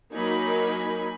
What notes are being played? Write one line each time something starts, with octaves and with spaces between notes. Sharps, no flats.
F#3 A#3 D#4 A#4 G#5 B5